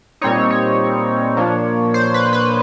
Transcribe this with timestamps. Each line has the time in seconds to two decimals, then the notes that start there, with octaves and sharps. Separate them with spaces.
0.21 A#2 G3 C4 D#4 C#5
0.51 C#5
1.37 A#2 F3 A#3 D4
1.94 C5
2.14 B4
2.33 B4